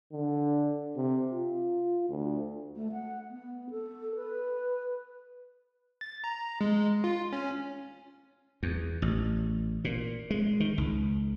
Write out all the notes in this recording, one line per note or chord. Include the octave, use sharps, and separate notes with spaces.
D3
C3
F4
D2
A3
F#5
B3
A4
B4
A6
A#5
G#3
F4
C#4
E2
A1
A#2
G#3
D#3
C#2